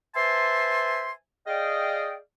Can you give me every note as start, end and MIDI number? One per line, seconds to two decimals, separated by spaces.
0.16 1.11 71
0.16 1.11 72
0.16 1.11 76
0.16 1.11 80
0.16 1.11 81
0.16 1.11 84
1.47 2.15 68
1.47 2.15 74
1.47 2.15 75
1.47 2.15 77
1.47 2.15 79